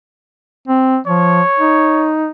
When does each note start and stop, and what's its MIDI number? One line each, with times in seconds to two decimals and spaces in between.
0.68 0.98 60
1.07 1.41 53
1.07 2.11 73
1.59 2.30 63